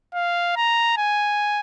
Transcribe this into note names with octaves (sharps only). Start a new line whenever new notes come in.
F5
A#5
G#5